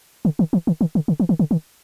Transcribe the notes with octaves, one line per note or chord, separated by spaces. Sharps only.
D3
D#3
E3
D#3
D#3
D3
D3
E3
D#3
D3
D#3